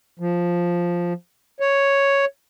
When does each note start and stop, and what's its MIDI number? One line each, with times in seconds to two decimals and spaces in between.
0.19 1.13 53
1.60 2.25 73